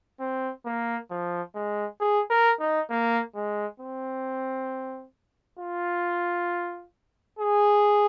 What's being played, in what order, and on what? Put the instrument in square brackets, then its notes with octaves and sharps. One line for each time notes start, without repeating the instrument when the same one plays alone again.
[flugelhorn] C4
A#3
F3
G#3
G#4
A#4
D#4
A#3
G#3
C4
F4
G#4